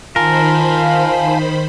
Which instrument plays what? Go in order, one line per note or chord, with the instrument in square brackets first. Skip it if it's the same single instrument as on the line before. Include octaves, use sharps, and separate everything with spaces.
[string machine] D#3 C5 B5 [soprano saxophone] F4 [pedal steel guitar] A#4 [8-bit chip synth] F5 G#5 A5